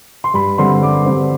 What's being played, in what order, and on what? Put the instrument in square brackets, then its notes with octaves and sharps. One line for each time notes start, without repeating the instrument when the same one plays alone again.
[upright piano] C6
G2 B5
D3 G3 C4 C6
G2 D6
D3 G3 C4